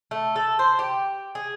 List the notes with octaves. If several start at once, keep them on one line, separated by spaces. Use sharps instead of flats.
A3
A4
C5
G4
G#4